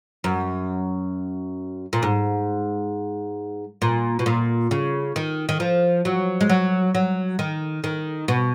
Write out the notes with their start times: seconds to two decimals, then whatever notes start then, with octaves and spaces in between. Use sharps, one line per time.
0.24 F#2
1.93 A#2
2.03 G#2
3.82 A#2
4.19 B2
4.26 A#2
4.71 C#3
5.16 D#3
5.49 D#3
5.60 F3
6.05 F#3
6.41 G#3
6.49 F#3
6.95 F#3
7.39 D#3
7.84 D#3
8.28 B2